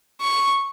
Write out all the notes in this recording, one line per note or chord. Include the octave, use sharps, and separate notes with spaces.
C#6